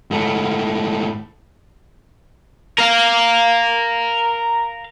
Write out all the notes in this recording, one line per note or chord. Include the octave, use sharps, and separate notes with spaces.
G#2 A3
A#4 F5